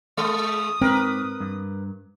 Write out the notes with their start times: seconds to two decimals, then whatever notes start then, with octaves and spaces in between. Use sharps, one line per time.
0.17 G#3 D#6
0.81 G#2 C4 A#4 B4
1.40 G2